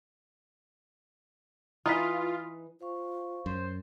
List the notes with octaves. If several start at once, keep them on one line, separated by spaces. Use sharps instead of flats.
E3 D#4 F4 B4 D#6 B6
F4 C5 F5 C#6
F#2 C5